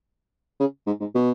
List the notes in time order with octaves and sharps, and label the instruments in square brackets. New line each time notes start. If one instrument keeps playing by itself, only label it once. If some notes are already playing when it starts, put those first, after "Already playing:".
[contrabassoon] C#3
G#2
G#2
B2